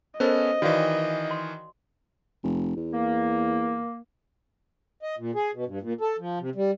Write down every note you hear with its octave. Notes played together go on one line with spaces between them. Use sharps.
B3 C#4 A4 A#4 C5 D#5
D#3 E3 F#4 D5 F5
C6
F1
E2
A#3
D#5
A#2
G#4
B2
G2
A#2
A4
F3
C3
G3